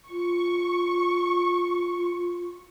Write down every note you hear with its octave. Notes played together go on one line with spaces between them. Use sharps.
F4 C#6